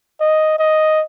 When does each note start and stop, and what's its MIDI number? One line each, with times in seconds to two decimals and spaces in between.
0.20 0.58 75
0.59 1.03 75